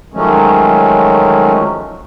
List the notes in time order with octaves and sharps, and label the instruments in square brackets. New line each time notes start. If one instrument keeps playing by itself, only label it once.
[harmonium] D#3 F3 F#3 G#3 A3 C#4